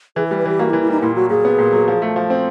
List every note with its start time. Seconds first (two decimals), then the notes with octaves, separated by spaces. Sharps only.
0.16 E3 G#4
0.27 B4
0.31 G3
0.38 B4
0.46 E3 G4
0.59 A#3 F#4
0.70 E4
0.73 E3
0.81 E4
0.88 G3 D#4
1.02 A#2 E4
1.16 F#3 F#4
1.30 A#2 G#4
1.45 B3
1.59 A#2
1.72 F#3
1.88 F3
2.02 A3
2.16 F3
2.30 C4